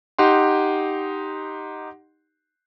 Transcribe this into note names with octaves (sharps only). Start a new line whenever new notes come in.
D#4 G4 F#5 C6